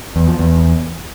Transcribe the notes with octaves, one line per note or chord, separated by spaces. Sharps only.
E2
F3
E2